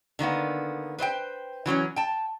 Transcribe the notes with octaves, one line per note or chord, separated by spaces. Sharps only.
D3 D#3 A#3 B3
B4 C5 D#5 G5
E3 F#3 C4 C#4
G5 A5